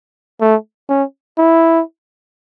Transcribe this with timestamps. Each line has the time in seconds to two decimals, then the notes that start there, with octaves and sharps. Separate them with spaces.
0.41 A3
0.89 C#4
1.38 E4